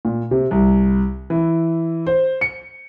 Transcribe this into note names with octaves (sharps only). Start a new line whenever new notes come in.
A#2
C3
C2
E3
C5
C#7